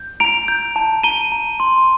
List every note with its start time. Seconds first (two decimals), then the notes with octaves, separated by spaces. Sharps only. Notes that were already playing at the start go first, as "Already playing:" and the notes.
Already playing: G6
0.20 A#5 D7 F7
0.48 G6
0.76 A5
1.03 A#5 D#7 G7
1.32 A#5
1.60 C6